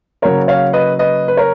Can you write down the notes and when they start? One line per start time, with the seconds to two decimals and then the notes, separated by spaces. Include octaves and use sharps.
0.22 C#3 F#3 A#3 A#4 C#5
0.48 C#5 F5
0.73 B4 D#5
0.99 B4 D#5
1.28 B4
1.37 A#4 C#5